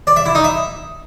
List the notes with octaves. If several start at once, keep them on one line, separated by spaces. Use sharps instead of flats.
D5
E5
E4
D#4
E5